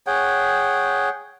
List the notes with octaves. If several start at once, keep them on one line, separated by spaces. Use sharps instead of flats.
G#4 C#5 F#5 G5